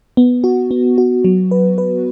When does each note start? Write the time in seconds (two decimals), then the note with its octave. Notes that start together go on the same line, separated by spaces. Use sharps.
0.17 B3
0.44 F#4
0.71 B3
0.98 F#4
1.25 F#3
1.51 B4
1.78 B4